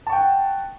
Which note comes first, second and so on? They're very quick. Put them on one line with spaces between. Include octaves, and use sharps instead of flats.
A5 C#6 G5 F#5